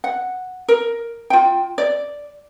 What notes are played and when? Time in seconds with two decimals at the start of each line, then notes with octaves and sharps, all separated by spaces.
0.04 F#5
0.68 A#4
1.30 F4 G5
1.78 D5